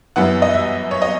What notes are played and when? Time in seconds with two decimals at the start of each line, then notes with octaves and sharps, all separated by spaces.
0.16 F#2 E3 B3 F#5
0.42 D#5
0.53 E5
0.91 C#5
1.02 D#5